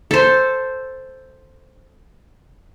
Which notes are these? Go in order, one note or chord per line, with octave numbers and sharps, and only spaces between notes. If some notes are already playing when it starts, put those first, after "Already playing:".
A4 C5